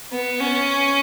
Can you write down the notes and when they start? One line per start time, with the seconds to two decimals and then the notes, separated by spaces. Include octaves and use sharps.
0.12 B3
0.40 C#4